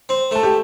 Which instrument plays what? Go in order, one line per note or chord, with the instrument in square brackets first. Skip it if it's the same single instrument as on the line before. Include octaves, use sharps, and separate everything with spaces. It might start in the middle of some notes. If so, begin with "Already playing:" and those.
[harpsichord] C4
[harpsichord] A3 [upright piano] A4
[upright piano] G4